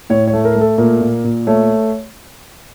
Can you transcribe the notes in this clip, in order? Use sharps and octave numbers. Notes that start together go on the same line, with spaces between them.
A2 C#5
C#5
A3
A#4
A3
A4
A#2 A#4
A#2
A#2
A3 C#5